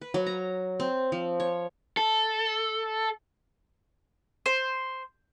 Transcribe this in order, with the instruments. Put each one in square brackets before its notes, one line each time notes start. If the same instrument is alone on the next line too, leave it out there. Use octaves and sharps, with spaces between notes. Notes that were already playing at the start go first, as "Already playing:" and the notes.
[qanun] B4
F#3
A#5
C4
F3
C#5
[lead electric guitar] A4
[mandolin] C5